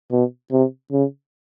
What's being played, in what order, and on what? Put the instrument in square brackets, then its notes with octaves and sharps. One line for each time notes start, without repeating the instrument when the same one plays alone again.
[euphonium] B2
C3
C#3